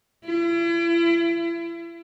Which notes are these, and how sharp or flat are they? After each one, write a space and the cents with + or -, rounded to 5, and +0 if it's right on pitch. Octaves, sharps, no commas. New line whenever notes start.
E4 +40